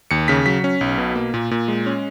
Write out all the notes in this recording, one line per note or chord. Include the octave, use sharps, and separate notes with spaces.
D#2 C#7
C#3 B6
F#3 B6
C#4
B1
B2
A#3
A#2
A#2
G#3
C#4